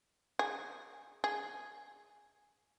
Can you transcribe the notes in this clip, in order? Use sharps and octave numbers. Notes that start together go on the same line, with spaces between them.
G#4
G#4